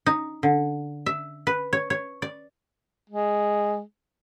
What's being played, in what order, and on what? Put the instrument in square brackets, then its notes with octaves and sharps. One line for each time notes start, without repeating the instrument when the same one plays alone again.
[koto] D#4
D3
E5
B4
C#5
C#5
D5
[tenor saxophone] G#3